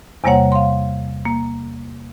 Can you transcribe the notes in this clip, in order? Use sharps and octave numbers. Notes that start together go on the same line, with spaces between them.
E2 C3 G3 A#3 C#5 F#5
F5 C6
A#3